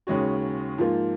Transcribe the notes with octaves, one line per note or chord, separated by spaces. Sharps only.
D#2 C#3 G#3 C#4 F#4
G#2 F3 A#3 F4